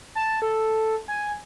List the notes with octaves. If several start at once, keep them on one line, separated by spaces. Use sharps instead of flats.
A5
A4
G#5